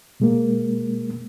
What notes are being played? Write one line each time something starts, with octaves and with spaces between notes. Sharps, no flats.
B2 G#3 A#3